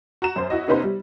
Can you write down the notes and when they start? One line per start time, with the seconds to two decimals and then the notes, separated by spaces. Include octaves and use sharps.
0.22 F#4 A#5 E7
0.36 F#2 C5
0.50 E4 F#4 D#5
0.68 C3 B3 C#4 D#4 B4 C5
0.83 G3